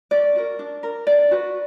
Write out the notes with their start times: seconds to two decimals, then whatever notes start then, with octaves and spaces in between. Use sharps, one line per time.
0.11 C#4 D5
0.36 F#4 A#4
0.59 D4
0.83 A#4
1.07 D4 D5
1.31 F#4 B4